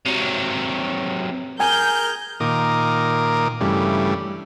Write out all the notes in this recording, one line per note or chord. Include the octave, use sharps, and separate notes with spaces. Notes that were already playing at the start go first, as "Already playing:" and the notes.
C3 F#3
G#4 A#4 G#5 G6
A#2 D#3 A#4 D6 D#6
G2 C#3 E3 G3 A3